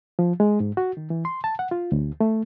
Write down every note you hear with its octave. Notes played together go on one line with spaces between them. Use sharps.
F3
G#3
G#2
F#4
D#3
E3
C6
A5
F#5
F4
D2
A3